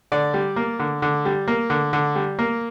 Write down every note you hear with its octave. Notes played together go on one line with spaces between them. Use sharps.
D3 D5
G3
A#3
D3
D3
G3
A#3
D3
D3
G3
A#3